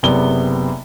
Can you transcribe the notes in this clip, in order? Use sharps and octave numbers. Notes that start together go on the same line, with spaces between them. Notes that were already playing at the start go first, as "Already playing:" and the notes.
F#1 C3 B3 D5 G7